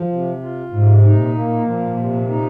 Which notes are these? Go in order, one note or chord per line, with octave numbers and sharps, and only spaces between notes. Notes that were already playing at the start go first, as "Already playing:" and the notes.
Already playing: F3
C3
F4
G#2 C3
D#4
A#2
A#3
F3
C3
D#4